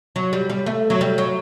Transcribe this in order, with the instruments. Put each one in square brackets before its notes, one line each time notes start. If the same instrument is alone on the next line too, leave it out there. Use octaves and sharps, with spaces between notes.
[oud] F#3
G3
G3
A3
F#3
G3
F#3